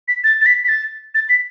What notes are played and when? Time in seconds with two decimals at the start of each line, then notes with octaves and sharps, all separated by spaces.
0.08 B6
0.24 A6
0.41 A6
0.46 B6
0.64 B6
0.68 A6
1.15 A6
1.29 B6